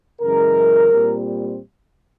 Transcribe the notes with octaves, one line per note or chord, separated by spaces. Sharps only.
F#2 C#3 E3 G#3 A#4
A#2 G3 C4